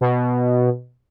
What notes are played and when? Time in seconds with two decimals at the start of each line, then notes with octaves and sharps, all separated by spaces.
0.01 B2